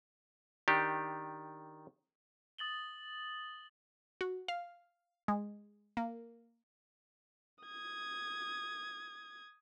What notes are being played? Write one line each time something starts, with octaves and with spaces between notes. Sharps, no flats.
D#3 D4 G4
D#6 A6 F#7 G7
F#4
F5
G#3
A#3
D#6 G#6